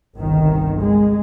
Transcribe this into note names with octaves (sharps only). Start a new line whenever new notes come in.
G1 C2 D#3
G#3